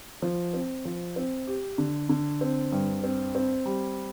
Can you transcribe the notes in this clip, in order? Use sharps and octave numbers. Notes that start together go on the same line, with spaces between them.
F3
C4
F3
C4
G4
D3
D3
C4
G2
C4
C4
G3